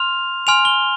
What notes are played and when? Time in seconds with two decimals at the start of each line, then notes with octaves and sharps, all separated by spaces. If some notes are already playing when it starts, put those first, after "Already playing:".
Already playing: C6 F6 F7
0.47 G#5 C6 F6 F7
0.65 G7